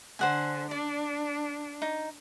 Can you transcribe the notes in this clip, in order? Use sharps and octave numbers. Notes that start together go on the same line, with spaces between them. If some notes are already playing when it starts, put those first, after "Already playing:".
D3 C5 F#5 G#5
D4 D5
D#4